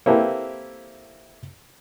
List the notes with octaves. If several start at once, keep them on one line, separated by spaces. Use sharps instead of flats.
A#3 C4 E4 G4 A4 B4